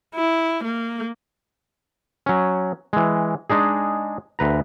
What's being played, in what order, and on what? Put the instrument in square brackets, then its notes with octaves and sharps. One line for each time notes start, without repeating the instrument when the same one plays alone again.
[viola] E4
A#3
[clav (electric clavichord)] F#3 C#4
E3 G#3
G#3 D4 D#4 G#4
D2 B4 A#5